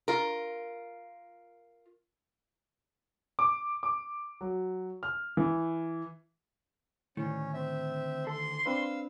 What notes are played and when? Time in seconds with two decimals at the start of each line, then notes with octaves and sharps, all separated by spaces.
0.08 F4 A#4
3.39 D6
3.83 D6
4.41 F#3
5.03 F6
5.37 E3
7.17 D2 A2 D#3 C#4
7.54 C4 E5
8.27 A4 C6
8.66 C4 D4 B4 F5 E6